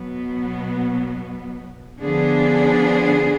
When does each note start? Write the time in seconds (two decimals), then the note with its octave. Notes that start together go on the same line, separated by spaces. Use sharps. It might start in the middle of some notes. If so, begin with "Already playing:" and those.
Already playing: B2 F#3 B3
2.01 D3 F3 B3 D4 G#4